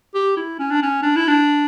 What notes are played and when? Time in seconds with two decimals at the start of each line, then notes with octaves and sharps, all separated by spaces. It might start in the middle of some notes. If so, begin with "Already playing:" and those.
0.15 G4
0.37 E4
0.59 C#4
0.71 D4
0.83 C#4
1.03 D4
1.16 E4
1.28 D4